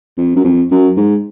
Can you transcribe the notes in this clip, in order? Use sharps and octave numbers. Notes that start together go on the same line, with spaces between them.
F2
F#2
F2
F#2
G#2